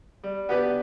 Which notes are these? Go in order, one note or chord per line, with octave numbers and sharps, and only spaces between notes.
G3
B3 D4 G4 B4